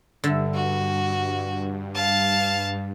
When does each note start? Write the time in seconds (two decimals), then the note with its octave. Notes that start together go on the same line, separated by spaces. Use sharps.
0.24 G2 D3 E5
0.54 F#4
1.95 F5 A5